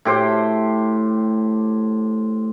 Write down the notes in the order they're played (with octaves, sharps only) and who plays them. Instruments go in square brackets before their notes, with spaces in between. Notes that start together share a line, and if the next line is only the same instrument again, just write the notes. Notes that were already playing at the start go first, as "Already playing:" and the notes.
[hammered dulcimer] A2 G4 C5